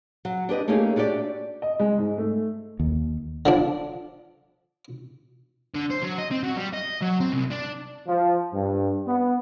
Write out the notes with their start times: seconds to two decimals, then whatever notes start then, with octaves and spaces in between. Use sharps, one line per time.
0.25 F#3
0.49 D4 G4 B4 D#5
0.68 A3 A#3 C#4 D#4 G4 G#4
0.96 A3 D4 F#4 G4 D5
1.62 D#5
1.80 G#3
1.98 G#2
2.18 A3
2.80 D#2
3.45 D3 F3 D4
5.74 D3
5.90 C5
6.02 F#3
6.18 D#5
6.31 C4
6.43 F#3
6.57 G3
6.74 D#5
7.02 F#3
7.20 C4
7.32 C2
7.50 D4
8.07 F3
8.54 G2
9.07 B3